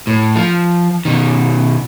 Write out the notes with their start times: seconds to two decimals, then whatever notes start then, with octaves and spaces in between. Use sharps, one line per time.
0.07 A2
0.36 F3
1.05 B2 D#3